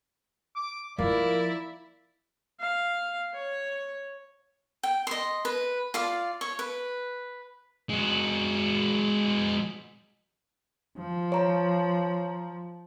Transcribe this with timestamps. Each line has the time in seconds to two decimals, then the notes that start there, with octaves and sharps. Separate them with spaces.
0.56 D6
0.98 F3 A#3 E4 D5
2.60 F5
3.34 C#5
4.83 G5
5.07 D#5 C6
5.45 B4
5.94 F4 D5 F5
6.41 C#5
6.59 B4
7.89 G#3 F#4
10.98 F3
11.32 C#5 A#5